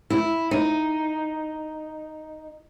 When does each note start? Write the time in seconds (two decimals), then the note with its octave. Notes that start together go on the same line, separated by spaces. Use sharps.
0.10 E4
0.51 D#4